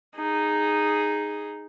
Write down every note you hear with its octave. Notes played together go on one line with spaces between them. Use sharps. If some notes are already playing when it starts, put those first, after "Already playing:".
D#4 G#4